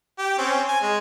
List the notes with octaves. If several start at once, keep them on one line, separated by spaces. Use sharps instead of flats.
G4
C4 C#4
G#5
G#3